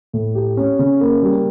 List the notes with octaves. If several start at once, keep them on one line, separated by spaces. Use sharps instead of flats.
A2
G4
C#4
C#3
A#3
G3